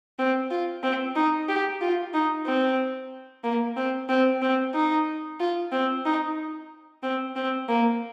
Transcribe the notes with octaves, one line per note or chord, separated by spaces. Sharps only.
C4
F4
C4
D#4
G4
F4
D#4
C4
A#3
C4
C4
C4
D#4
F4
C4
D#4
C4
C4
A#3